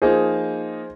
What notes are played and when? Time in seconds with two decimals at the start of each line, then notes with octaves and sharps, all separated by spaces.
0.02 F3 A#3 D#4 G#4 C5